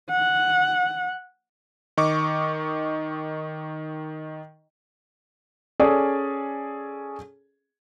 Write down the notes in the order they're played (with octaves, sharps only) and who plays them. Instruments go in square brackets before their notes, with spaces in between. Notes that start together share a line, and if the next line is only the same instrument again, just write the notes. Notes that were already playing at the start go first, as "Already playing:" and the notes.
[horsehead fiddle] F#5
[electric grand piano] D#3 D#5 C#6 D6
[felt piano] C#4 G#4 A4 D5